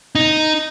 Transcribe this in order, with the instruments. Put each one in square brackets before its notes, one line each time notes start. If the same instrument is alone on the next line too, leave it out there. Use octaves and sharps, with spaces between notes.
[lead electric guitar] D#4